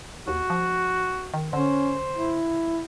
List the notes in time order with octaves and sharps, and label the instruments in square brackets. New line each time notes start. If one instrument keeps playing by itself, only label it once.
[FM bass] D#2 [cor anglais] F#4
[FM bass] F3
D#3
[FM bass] D3 [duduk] C#4 [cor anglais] C5
[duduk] E4